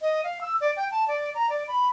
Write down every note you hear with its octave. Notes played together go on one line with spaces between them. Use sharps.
D#5
F5
E6
D5
G5
A5
D5
A#5
D5
B5